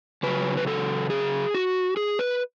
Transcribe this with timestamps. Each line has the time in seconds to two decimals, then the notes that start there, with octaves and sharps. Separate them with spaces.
0.23 C#3 F#3 B4
0.57 B4
0.67 A4
1.10 G#4
1.55 F#4
1.97 G#4
2.19 B4